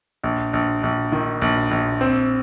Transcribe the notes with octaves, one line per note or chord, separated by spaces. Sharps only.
A#1
A#1
A#1
D#3
A#1
A#1
C4